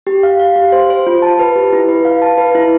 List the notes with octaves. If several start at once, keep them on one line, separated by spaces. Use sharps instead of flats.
G4
F5
F5
G4
C5
C5
F4
A5
B4
G4
E4
B4
F5
A5
B4
E4